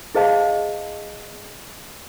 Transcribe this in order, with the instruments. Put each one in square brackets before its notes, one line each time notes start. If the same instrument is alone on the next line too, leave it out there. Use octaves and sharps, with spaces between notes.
[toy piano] E4 G#4 C5 D#5 F5 A5